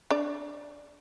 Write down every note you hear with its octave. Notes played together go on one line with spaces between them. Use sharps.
D4 D5